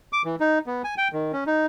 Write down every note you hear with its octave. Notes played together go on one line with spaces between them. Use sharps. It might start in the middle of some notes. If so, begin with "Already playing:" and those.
D6
E3
D#4
B3
G#5
G5
D#3
C#4
D#4